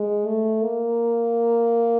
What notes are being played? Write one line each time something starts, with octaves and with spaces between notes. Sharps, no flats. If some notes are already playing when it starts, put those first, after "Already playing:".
Already playing: G#3
A3
A#3